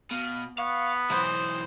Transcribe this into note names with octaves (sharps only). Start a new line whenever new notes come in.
B2 F5
B3 F5 C#6
B1 E3 C5 D#6